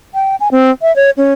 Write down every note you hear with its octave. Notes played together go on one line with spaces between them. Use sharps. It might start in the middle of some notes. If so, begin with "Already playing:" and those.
G5
G#5
C4
E5
C#5
C#4